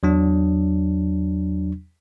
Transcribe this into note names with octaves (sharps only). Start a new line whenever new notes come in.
E2 F#3 D4